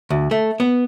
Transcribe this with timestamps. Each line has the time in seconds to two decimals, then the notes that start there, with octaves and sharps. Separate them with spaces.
0.10 D2
0.31 A3
0.60 B3